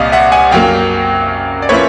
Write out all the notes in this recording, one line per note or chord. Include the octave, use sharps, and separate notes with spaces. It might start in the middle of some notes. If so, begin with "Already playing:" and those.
Already playing: C2 A#2 G3 C4 D#5 F5
E5 F#5
F#5 G#5
F#2 C#3 F#3 A#3 F5 G5
D5
F3 A#3 C#4 E4 B4 C#5